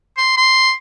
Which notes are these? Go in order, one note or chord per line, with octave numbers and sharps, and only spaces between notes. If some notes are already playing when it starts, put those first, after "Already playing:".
C6
C6